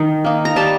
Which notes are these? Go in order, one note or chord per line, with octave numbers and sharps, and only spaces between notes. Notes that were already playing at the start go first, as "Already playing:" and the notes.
Already playing: D#3 D#4
A#3 D#4
A#5
G3 A5